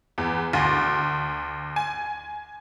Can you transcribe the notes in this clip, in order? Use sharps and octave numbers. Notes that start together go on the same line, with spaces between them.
E2
D2
G#5